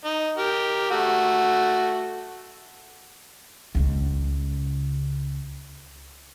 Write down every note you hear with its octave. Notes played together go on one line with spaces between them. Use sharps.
D#4
G4 A#4
A3 F#4
C#2 C#3